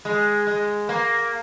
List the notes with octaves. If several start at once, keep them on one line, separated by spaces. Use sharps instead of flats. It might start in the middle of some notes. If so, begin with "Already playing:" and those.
G#3
G#3
A#3